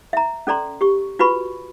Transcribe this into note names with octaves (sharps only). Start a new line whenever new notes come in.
E5 A#5
C#4 A4 D5 A#5 C6
G4 C#6
F4 F#4 B4 B5 C#6